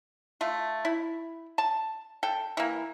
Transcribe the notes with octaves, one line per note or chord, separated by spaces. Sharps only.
A3 F4
E4
A5
A4 G5
E3 A#3